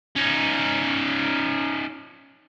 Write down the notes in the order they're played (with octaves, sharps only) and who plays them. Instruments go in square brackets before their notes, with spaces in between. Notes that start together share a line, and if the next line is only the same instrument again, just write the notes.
[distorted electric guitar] C#4 D#4